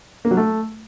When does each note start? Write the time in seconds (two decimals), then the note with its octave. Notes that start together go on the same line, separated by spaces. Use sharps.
0.25 A#3
0.31 F#3
0.37 A3